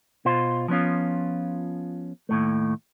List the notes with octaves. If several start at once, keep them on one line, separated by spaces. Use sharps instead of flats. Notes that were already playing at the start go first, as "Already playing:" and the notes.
B2 F4 C5
F3 B3 C#4 F4
D#2 A2 A3